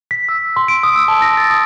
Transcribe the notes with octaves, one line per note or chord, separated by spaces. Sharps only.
B6
E6
C6
D7
D#6
E6
A5
A#6
A6
D#6